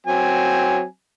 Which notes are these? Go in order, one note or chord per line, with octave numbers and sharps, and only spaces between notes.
F#3 C4 G#5